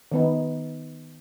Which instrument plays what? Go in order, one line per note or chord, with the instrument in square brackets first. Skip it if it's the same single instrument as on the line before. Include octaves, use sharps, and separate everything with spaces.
[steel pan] D#3 B3 D#4